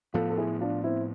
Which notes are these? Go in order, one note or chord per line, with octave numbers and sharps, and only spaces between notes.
A2 F3 B3 F4 A4
A4
E4 G#4
D4 F4
C4 E4